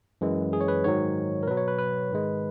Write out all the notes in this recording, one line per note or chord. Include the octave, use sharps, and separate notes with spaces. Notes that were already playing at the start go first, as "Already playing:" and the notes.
F#2 E3 G#3
G#4
C#5
B4
G#2 D#3 F#3 C#5
A#4
B2 F#3 B4
C#5
B4
B4
G#2 D#3 G#3